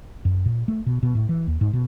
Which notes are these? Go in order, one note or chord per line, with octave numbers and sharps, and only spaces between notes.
F#2
A#2
A3
B2
B2
A2
E3
D#2
G#2
B2